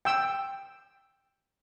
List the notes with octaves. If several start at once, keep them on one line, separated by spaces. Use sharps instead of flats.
G5 E6